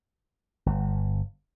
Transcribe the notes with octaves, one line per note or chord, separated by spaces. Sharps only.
G1